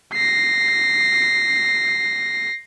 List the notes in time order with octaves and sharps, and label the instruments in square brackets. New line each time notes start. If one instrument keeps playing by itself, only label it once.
[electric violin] A#6 C7